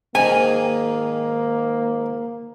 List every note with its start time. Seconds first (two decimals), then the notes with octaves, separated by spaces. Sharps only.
0.15 G#2 D#3 A#3 G#5